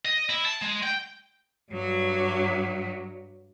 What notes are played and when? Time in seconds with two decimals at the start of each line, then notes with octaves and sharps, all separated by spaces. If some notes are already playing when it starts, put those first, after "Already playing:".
0.05 D#5
0.30 E4
0.46 A5
0.62 G#3
0.83 G5
1.72 G2 F#3